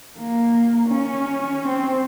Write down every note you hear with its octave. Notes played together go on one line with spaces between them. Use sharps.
A#3
C#4
C4